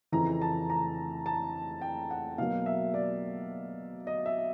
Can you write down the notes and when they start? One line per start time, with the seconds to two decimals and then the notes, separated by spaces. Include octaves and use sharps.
0.12 F2 C#3 E3 A#5
0.42 A5
0.70 A#5
1.26 A5
1.82 G5
2.11 F#5
2.38 B2 F#3 A#3 F5
2.66 E5
2.94 D5
4.07 D#5
4.26 E5